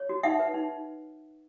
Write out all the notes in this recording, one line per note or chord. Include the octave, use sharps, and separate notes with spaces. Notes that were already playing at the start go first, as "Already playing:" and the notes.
Already playing: C#5
F#4
D#4 E5 F#5
B4
D#4